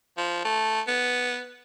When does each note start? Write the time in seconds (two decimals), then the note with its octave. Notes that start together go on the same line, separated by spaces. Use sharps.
0.17 F3
0.45 A3
0.87 B3